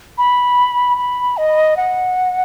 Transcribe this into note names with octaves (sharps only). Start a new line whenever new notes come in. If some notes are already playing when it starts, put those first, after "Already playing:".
B5
B5
D#5
F#5